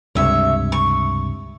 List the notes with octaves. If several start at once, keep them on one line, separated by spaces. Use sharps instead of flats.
C#2 G2 C3 C#5 E5
C#6